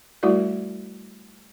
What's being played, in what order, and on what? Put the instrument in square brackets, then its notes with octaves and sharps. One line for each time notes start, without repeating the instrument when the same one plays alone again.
[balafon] G3 A3 E4 F#4 A#4 D5